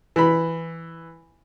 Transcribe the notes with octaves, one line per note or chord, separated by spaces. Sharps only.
E3 B5